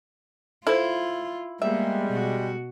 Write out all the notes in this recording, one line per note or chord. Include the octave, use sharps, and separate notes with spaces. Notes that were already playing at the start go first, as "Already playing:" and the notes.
E4 F4 A4 C5
G3 G#3 A#3 B3 E5
B2 F#4